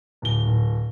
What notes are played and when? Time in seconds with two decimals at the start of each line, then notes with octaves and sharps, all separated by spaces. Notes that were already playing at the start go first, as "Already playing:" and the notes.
0.22 D1 G7
0.46 D1